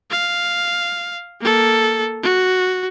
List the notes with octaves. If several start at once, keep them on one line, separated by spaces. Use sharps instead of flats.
F5
A#3 A4
F#4